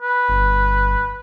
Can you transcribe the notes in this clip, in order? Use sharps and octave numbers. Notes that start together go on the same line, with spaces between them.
B4
G1